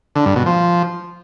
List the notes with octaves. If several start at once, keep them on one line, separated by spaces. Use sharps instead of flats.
D3
G2
B2
F3